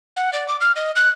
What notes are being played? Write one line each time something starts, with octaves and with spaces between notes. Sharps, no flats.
F#5
D5
D6
F6
D#5
F#6